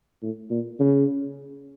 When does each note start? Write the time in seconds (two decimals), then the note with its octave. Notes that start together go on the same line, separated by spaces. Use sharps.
0.22 A2
0.50 A#2
0.80 C#3